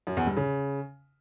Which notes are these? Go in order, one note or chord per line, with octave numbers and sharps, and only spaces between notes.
F#2
E2
G2
C#3